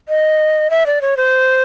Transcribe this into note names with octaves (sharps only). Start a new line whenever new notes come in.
D#5
E5
D5
C#5
C5